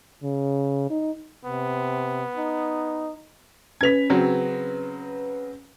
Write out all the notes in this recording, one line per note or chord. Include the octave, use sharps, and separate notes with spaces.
C#3
D#4
C3 B3
D#4
C#4 B4 G#6 B6 F7
C#3 F#3 C4